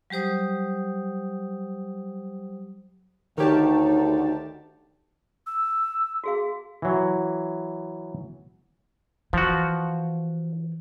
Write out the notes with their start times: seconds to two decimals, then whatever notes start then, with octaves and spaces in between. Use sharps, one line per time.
0.10 F#3 G3 G4 C5 D#6
3.38 D2 D#3 D#4 G4 A#4 C#5 A5
5.47 E6
6.24 F#4 G#4 F5
6.82 E3 F#3
9.33 E3 F3 F#4